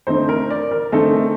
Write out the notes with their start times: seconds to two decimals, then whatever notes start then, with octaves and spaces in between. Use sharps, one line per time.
0.07 D3 A3 C4 D#4 C5
0.29 A#4
0.50 D5
0.71 A#4
0.92 D3 A3 C4 D#4 A4